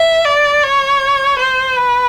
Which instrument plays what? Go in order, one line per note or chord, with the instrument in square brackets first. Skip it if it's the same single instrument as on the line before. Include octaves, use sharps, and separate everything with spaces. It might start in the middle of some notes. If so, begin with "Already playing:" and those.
Already playing: [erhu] E5
D5
C#5
C5
B4